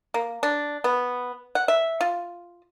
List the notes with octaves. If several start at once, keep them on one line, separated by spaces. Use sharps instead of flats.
A#3
D4
B3
F#5
E5
F4